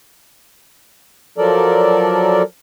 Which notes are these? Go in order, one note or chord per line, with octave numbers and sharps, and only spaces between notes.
F3 F#3 A4 A#4 D5